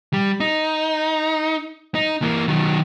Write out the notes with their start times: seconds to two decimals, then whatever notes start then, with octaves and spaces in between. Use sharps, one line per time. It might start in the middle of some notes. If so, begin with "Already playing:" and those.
0.13 G3
0.40 D#4
1.95 D#4
2.22 E3 A#3
2.48 D#3 F#3